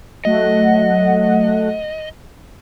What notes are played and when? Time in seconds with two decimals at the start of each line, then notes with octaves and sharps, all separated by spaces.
0.25 F#3 A3 D#5 F#5